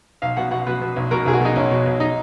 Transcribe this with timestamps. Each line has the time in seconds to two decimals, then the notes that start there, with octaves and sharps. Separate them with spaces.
0.22 B1 F5
0.37 B2 F#5
0.51 B2 F#5
0.67 B2 B4
0.81 B2
0.96 B1
1.11 B2 A#4
1.26 B1 G#4
1.33 F#4
1.41 B2 D#4
1.56 B1 C#4
1.71 B2
1.86 B1
2.00 D#4